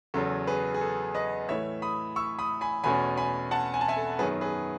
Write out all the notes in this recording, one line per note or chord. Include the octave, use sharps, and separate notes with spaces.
E2 C#3 F#3 C#4 A4
G#4 B4
G#4
A4
B4 D#5
A2 E3 A3 C#5 E5
B5 D#6
C#6 E6
B5 D#6
G#5 B5
E2 B2 A3 C#4 G#5 B5
G#5 B5
F#5 A5
G#5
A5
E5 G#5
A4
F#2 D#3 F#3 B3 G#4 B4
G#4 B4